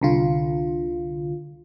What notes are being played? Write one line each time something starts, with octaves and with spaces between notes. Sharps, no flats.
C2 D3 F4